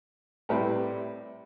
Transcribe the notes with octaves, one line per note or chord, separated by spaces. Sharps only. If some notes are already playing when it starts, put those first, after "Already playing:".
A2 G3 C4 E4 B4